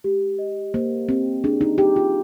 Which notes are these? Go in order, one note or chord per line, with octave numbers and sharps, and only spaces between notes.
G#3 G4
D#5
A#3 C5
C4 G4
D4 G#4
D#4
G4 G5
F4